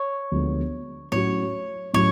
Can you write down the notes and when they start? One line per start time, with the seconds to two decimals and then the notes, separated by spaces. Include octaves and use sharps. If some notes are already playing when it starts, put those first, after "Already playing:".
Already playing: C#5
0.31 D2 D3 F3 G#3 B3
1.12 A2 F#3 C#4 F#4 C#5
1.94 A2 F#3 C#4 F#4 C#5